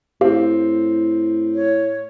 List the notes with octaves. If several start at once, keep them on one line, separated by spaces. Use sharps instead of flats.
A2 C4 G4 F5
C#5